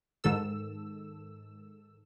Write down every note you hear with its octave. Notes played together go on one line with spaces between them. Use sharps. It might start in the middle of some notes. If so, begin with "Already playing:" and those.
G#2 D#3 A4 E6